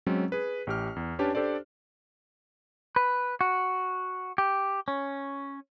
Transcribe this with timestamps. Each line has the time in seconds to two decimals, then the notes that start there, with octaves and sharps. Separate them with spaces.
0.07 F#3 G#3 C4 C#4
0.32 G#4 B4
0.67 A1 G4 F6
0.96 E2
1.19 C#4 D4 G4 B4 C#5 A5
1.35 D4 G4 A4 C5 D5
2.96 B4
3.41 F#4
4.38 G4
4.88 C#4